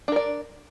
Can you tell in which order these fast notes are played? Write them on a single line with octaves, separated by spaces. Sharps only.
D4 A#4 D5